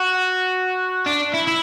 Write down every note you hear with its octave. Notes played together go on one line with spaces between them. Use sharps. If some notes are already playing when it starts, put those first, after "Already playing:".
Already playing: F#4
D4
E4
E4